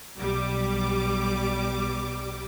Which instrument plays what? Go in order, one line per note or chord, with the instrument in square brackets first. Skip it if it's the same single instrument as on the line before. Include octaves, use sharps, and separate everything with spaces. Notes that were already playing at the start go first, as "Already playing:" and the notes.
[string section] B1 G3 D6